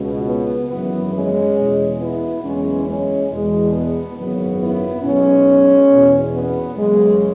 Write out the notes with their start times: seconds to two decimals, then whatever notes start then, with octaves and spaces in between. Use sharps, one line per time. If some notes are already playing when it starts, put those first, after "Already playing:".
Already playing: C#2 B2
0.26 B3
0.69 G#1 F#2 E3 B3
1.13 G#3 C#4
1.56 E2 B2
2.00 B3 E4
2.43 F#1 E2 C#3 E3 G#3 C#4
2.87 G#3 C#4
3.29 E2 B2 G#3
3.72 B3
4.16 G#1 F#2 C#3 B3
4.59 B3 E4
5.03 B1 B2 G#3 C#4
5.90 E2 B2
6.32 B3
6.76 F#1 F#2 C#3 E3 G#3